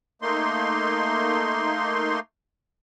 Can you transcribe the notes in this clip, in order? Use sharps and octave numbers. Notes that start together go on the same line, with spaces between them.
A3 A#3 D#4 C6